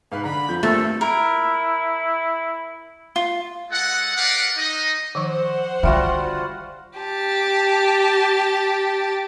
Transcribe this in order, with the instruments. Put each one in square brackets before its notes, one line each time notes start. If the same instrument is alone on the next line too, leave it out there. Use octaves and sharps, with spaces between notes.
[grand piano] G#2 F5 B5 [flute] B4
[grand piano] D3 D4 A#5 [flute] B5
[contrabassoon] F2 [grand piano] G6
[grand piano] G2 C4 F6 [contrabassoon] A#2 [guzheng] A3 [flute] A4
[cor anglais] E4 [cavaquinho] A#4
[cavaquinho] F4
[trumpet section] G#3 A4 D#5 F#5
G4 A#4 B4 D5 F5 F#5
D#4 D#5
[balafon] D#3 F3 C#6 [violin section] C5 F#5
[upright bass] D3 [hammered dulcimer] G3 F4 F#4 [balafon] E5 F5 G5
[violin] G4 A5